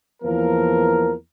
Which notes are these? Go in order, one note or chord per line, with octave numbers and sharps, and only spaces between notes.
E2 E3 F3 A#3 A#4